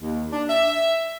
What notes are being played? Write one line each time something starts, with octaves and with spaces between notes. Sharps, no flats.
D#2
D4
E5